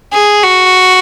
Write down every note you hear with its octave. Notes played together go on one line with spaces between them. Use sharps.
G#4
F#4